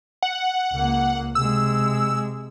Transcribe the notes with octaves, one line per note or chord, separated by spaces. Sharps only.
F#5
C#2 A#3
C3 G#3 E6